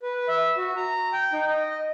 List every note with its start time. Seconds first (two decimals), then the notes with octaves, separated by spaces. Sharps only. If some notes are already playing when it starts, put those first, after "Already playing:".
0.03 B4
0.28 E5
0.57 F#4
0.76 A#5
1.13 G5
1.33 D#4
1.50 D#5